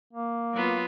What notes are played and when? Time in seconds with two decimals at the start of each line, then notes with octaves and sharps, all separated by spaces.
0.13 A#3
0.53 F#3 B3 F4